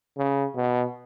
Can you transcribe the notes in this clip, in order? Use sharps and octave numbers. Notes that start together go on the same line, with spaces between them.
C#3
B2